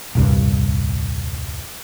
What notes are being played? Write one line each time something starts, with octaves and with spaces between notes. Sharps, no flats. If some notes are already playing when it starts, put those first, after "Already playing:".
D#1 C2 G2